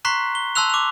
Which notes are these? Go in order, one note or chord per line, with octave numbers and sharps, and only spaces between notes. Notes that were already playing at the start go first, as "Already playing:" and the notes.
A#5 C6 C#6 F#6 B6 C7
G7
A5 C6 E6 F#6 F7
D6 F7